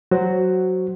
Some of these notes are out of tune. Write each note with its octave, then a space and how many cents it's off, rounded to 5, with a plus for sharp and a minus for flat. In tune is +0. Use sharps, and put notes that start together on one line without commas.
F#3 +0 F#4 +10 C5 +0